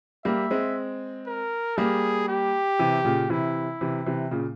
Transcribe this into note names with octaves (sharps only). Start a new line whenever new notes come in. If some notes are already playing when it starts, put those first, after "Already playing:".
G3 A#3 E5
G#3 C4
A#4
G3 A#3 G#4
G4
C3 E3
A#2 C#3
C3 E3 E4
C3 E3
C3 E3
A#2 C#3